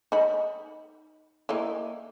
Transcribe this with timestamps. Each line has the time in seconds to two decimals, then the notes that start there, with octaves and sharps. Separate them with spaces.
0.12 D#4 B5
1.49 A#3 D#4 E4